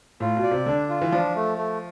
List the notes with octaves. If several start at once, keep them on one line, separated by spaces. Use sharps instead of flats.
A2 F4
B2
D5
C3
D3 D4
F4
E3
F3 D4
A3
A3